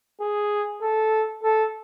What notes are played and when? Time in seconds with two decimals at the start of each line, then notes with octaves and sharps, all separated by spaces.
0.21 G#4
0.82 A4
1.43 A4